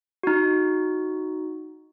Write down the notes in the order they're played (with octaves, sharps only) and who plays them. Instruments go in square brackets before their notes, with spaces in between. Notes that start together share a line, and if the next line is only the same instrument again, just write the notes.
[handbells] D#4 F#4